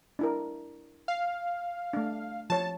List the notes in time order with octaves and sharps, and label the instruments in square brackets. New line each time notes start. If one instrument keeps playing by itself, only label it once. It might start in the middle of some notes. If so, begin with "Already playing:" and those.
[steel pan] D4 E4 A#4
[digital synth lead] F5
[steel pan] A3 D4
[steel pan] F3 C#5 [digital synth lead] A5